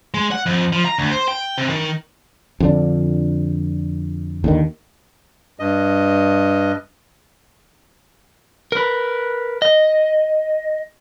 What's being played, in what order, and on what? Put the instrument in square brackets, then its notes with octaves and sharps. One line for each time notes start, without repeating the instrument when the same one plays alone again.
[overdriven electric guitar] G#3
F#5
F2
F3
A#5
D2
C5
G5
C3
D#3
[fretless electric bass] F2 D3 D4
D#2 D3 D#3
[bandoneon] G2 D#5
[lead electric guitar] A#4 B4
D#5